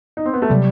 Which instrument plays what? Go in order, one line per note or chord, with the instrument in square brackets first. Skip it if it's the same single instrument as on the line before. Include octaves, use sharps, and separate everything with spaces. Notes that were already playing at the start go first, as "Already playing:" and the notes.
[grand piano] D#4
C4
B3
A3
[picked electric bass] C3 F#3 [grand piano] G3